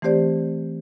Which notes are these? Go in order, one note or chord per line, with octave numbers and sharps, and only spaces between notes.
E3 A3 C4 G4 C5 D5